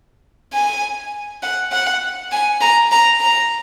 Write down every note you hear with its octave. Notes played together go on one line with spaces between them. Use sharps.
G#5
F#5
F#5
G#5
A#5
A#5
A#5